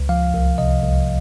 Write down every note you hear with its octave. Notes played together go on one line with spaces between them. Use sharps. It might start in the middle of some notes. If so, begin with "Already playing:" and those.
Already playing: C#2
F3 F5
C2
C3 D#5
C2